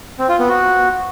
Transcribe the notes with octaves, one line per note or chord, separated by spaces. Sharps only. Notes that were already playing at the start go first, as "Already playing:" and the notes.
C4
F4
B3
F#4